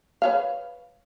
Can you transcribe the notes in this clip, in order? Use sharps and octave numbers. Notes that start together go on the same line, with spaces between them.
B4 C#5 F5